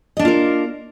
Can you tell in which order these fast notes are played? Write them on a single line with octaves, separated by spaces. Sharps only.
D#5 D4 A#3 F4 A#4